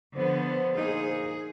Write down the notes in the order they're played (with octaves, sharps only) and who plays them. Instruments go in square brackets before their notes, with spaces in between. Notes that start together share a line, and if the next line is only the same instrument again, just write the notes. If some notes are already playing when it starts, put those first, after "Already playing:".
[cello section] D3 F3 B3 [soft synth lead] C5
[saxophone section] A#2 A#3 D#4 [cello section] G#4